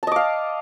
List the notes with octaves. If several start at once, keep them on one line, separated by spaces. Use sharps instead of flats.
D#5 F5 A5 D6